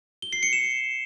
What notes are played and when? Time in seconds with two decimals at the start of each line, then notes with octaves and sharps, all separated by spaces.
0.22 G7
0.33 C7
0.43 C#7
0.53 E7